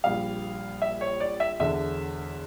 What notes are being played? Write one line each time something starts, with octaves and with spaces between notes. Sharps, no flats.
A#1 A#2 G3 F5
E5
C#5
D5
E5
E1 E2 D3 E5